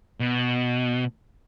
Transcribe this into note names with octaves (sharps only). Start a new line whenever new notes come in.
B2